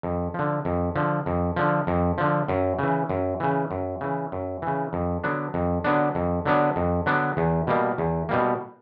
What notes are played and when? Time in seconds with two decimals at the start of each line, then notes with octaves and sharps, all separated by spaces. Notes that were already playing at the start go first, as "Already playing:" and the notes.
0.03 F2
0.34 D3 F3
0.65 F2
0.96 D3 F3
1.26 F2
1.56 D3 F3
1.87 F2
2.18 D3 F3
2.48 F#2
2.79 C#3 E3
3.09 F#2
3.40 C#3 E3
3.71 F#2
4.01 C#3 E3
4.32 F#2
4.62 C#3 E3
4.93 F2
5.24 D3 F#3 B3 D4
5.54 F2
5.84 D3 F#3 B3 D4
6.15 F2
6.45 D3 F#3 B3 D4
6.76 F2
7.06 D3 F#3 B3 D4
7.37 E2
7.67 B2 G3 A#3
7.98 E2
8.29 B2 G3 A#3